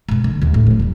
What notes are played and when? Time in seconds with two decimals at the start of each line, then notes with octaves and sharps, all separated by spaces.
0.09 G#2 B2
0.24 D3
0.42 D#2 G#3
0.54 A2
0.67 F3 D4
0.80 E1 G3